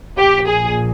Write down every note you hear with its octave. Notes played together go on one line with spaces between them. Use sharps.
A#1 A#2 G4
G#4